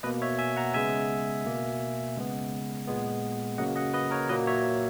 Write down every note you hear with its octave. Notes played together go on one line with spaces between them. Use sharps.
B2 A#3 B4 D#5
C#5 E5
E5 G#5
F#5 A#5
C#3 G#3 B3 E5 G#5
B2 A#3
C#3 G#3 B3
A#2 G#3 B3
C#3 F#3 A#3 D#5 F#5
D#5 F#5
B4 D#5
A#4 C#5
A#2 F#3 A#3 B4 D#5
C#5 E5